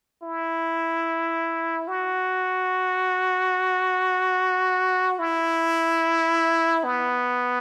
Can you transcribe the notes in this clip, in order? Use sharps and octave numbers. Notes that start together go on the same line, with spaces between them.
E4
F#4
E4
B3